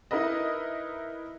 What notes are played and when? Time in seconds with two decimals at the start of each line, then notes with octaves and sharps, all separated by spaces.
0.11 D#4 E4 A#4 B4 D#5